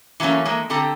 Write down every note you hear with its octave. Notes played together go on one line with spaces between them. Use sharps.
E3 F#3 A3 A#3 C#4
E3 G#3 A#3
D3 C4 G4 A4 A5 A#5